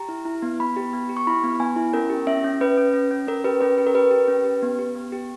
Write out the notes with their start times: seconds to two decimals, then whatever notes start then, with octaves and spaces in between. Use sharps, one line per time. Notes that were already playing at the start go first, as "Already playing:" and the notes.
Already playing: G4 A#5
0.09 E4
0.25 E4
0.42 B3
0.60 B3 B5
0.76 G4
0.93 B3
1.09 G4
1.17 C#6
1.27 E4 B5
1.44 B3
1.60 B3 G#5
1.76 E4
1.93 C#4 A#4
2.10 G4
2.27 C#4 E5
2.44 C#4
2.60 C#4 B4
2.77 C#4
2.94 C#4
3.11 C#4
3.27 C#4 A#4
3.44 G4 B4
3.61 C#4 B4
3.78 G4 B4
3.87 A#4
3.95 G4 B4
4.11 G4
4.28 C#4
4.44 G4
4.62 B3
4.79 G4
4.96 B3
5.12 G4